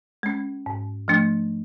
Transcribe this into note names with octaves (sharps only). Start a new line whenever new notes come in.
G#3 C#4
G#2
F3 A3 D4